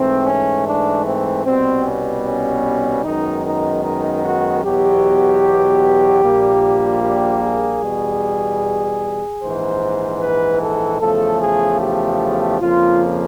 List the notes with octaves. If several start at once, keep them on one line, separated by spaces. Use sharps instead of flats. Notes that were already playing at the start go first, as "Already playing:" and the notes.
Already playing: G#2 E3 A3 C4
C#4
D4
C4
C2 B2 G3 B3 C4
C#4
C#4
F#2 D#3 G#3 B3 D#4
D#4
D#4
F#4
E2 B2 F#3 G4
A#1 A#2 G3 A#3
G4
G#4
E2 B2 G3
A#1 G#2 E3 C5
B4
A4
E2 C#3 F3 A3 A4
G#4
G4
F2 C#3 F3 A#3 F4